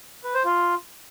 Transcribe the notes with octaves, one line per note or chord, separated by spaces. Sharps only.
B4
C5
F4